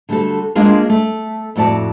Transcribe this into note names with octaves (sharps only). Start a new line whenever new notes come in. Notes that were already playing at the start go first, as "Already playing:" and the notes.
D3 G3 A3 F#4 A4
G#3 A#3 D4 F4 G#4 A#4
A3
F2 A2 F#4 D5 A5